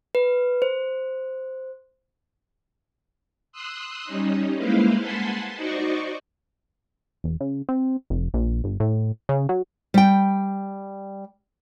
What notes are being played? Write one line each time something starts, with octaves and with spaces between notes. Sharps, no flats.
B4
C5
C6 D#6 E6 F#6
G3 C#4 D#4
G#3 A#3 E4 B4 C5 F5
F#5 G#5 A5 B5 C6
D#4 F#4 C5 D5 D#5 C#6
E1
C#3
C4
F1
A#1
G1
A2
C#3
F#3
G3 G5